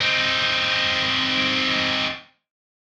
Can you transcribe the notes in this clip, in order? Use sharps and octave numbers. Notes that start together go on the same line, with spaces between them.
C4 D#4